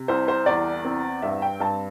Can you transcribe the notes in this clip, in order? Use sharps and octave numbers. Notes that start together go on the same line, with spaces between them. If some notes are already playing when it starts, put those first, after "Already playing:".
Already playing: C3
C2 C5
C5
E2 D5
C4
G2 E5
G5
G2 A5